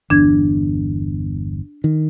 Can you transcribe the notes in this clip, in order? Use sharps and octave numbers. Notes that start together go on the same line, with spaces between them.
G1 E2 D4 G#6
D#3